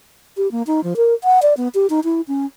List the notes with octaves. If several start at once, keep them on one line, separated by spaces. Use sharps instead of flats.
G4
A#3
D#4
F3
A#4
F#5
D5
B3
G4
D#4
E4
C#4